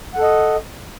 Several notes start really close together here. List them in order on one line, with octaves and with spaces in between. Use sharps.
F#5 A4 D#5